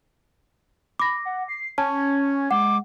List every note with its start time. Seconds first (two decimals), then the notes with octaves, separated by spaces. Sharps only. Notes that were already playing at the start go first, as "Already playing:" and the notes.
1.00 B5 D6 A#6
1.25 F#5
1.48 C7
1.78 C#4 A5 G#6
2.51 G#3 F#5 D6